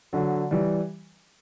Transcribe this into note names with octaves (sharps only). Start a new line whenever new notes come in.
D3 F#3
E3 G3